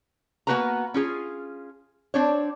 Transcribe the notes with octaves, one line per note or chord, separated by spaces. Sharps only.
A#3 B3 F#4 B4 G#5 A#5
C#4 F4 G#4
C4 D4 C#5